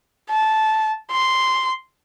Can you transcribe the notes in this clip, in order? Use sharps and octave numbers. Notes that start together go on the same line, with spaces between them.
A5
C6